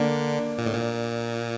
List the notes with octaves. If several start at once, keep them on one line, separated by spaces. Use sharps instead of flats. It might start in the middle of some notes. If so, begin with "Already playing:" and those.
Already playing: D3 A#3 D4
A#2
A2
A#2